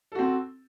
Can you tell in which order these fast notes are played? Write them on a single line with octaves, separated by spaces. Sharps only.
A4 F#4 C4